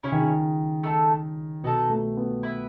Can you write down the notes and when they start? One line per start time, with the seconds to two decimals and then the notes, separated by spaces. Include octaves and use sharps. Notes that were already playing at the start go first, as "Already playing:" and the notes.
0.03 C#3 C#4 E4 G#4 C#5
0.12 D#3
0.21 C#3
0.83 A3 D#4 A4
1.64 B2 B3 D#4 A4
1.90 A3
2.17 B3
2.43 E4 B4 E5